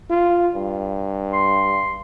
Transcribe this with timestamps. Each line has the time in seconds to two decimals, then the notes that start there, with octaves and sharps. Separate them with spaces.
0.10 F4
0.55 G2
1.33 C6